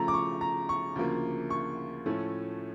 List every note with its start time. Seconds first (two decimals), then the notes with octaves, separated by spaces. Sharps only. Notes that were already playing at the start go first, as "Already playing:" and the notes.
Already playing: C#3 F3 A3 A#5
0.08 D6
0.14 C#6
0.41 A#5
0.69 C#6
0.96 D2 C#3 F3 A#3
1.50 C#6
2.06 A2 F3 A3 C#4